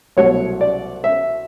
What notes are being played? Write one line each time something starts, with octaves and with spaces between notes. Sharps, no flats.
C2 B2 F#3 A3 C#5
D5
E5